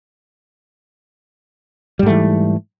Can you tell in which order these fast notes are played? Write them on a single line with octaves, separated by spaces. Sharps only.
G3 G#2 A3 E3